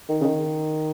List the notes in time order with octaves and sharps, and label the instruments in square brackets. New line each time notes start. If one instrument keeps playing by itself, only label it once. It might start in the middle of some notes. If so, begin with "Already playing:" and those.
[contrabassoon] D#3
C#3
D#3